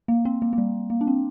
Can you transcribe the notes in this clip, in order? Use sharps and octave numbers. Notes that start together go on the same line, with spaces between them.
A#3
C4
A#3
A#3
G3
A#3
D4
C4